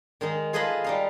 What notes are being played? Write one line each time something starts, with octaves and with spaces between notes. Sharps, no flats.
D#3 G#3 D#4
F4 G#4 A4 B4 D#5 B5
G3 D#4 F5